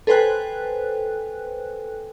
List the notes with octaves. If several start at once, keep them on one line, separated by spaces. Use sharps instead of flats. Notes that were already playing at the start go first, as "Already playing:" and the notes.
A4 B4 C5 G5 G#5 F#6